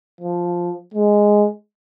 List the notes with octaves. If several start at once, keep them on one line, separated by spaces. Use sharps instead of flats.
F3
G#3